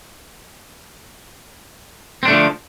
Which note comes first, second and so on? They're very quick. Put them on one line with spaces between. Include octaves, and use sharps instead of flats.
C4 D4 A3 D3 F3